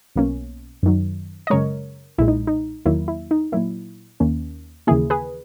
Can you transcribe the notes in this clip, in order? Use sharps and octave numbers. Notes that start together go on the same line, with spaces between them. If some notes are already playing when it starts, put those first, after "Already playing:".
B1 B2 A#3 C#4
F#2 D#3 F#3
D#5
F#2 C#3 G#3 A#4 C#5
B1 A#2 G#3 E4
D#4
D#4
E2 D#3 F#3 A#3 E4
E4
D#4
A#2 F#3 A#3 E4
D#2 D#3 A#3 C#4
D#2 C#3 E3 A#3 E4 G#4
G#4 B4